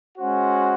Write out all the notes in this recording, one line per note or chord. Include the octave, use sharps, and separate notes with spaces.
G#3 C#4 F#4 C5 F#5